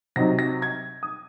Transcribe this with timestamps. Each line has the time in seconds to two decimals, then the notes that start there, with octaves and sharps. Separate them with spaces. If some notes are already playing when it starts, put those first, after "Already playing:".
0.16 C3 F#3 C4 D#4 A#6
0.39 A#6
0.62 G#6
1.03 D#6